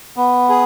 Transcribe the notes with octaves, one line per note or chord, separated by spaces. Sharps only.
B3
G#4